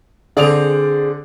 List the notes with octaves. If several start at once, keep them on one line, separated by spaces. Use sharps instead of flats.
D3 C4 G#4 D5 F7